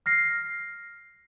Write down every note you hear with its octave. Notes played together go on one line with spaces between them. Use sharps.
F6 A#6 C7